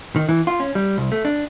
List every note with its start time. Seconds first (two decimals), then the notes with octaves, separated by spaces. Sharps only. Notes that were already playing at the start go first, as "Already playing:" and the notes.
0.16 D#3
0.29 E3
0.47 F4
0.60 C#4
0.75 G3
0.98 C2
1.12 A3
1.25 D4